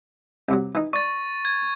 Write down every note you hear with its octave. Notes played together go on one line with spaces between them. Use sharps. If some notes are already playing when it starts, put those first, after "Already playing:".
C2 C3 F#3
E3 D#4
D5 C#6 A6
G#6